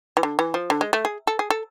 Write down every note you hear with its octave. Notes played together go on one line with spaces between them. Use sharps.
E3
D3
E3
F3
D3
G#3
A3
G#4
A4
G#4
A4